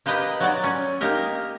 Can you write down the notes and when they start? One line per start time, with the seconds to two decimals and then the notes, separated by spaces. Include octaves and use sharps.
0.06 A#3 G4 B4 D#5 G5
0.40 F#3 F#4 D5
0.64 C#4
1.01 A#3 D#4 G4 A#4